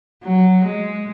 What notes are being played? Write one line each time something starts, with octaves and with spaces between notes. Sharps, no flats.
F#3
G#3